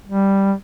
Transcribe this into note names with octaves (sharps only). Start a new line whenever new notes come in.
G3